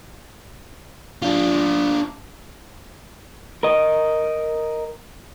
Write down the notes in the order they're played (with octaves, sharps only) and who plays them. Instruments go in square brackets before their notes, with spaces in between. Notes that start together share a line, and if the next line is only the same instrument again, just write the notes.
[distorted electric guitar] D4 F4
[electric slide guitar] A#4 D#5